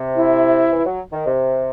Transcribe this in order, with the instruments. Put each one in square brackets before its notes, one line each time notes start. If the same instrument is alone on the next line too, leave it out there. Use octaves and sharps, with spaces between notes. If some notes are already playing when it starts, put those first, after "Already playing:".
Already playing: [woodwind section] C3
[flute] E4
[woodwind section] E3
F#3
D#3
C3